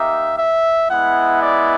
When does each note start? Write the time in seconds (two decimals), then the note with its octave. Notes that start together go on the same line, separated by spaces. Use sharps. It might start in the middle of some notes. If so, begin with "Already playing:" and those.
Already playing: A#3 D#4 G4 E5
0.38 E5
0.90 G#3 B3 E4 F#5
1.42 D5